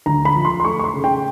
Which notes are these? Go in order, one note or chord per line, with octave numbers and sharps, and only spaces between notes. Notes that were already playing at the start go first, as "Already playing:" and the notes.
D2 A#5
B5
F3
C6
C6
A3 C#6
C#6
C6
C#3
G5